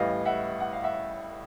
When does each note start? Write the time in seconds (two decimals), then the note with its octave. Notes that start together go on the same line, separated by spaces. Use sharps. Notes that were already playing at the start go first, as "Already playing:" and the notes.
Already playing: A1 A2 E3 G3 D#5 F5
0.25 E5 F#5
0.60 F#5
0.73 F5
0.83 E5 F#5